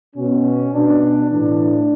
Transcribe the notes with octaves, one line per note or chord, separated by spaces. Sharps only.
B2 C#4
B2 D4
A2 E3 D4